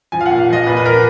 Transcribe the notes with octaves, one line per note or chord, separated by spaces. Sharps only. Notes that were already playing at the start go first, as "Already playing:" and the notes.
F3 G#5
F5
F#5
A#2
F5
F3 D#5
A#2 B4
B4
F3 A#4